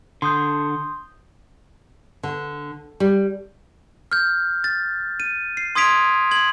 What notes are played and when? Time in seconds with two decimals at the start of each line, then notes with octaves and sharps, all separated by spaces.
0.22 D3 C6 D#6 G6
2.23 D3
3.00 G3
4.11 F6 G6
4.64 A6
5.20 D#7
5.57 C7
5.75 C6 D#6 G#6 B6 D7 F7
6.31 G#6 F#7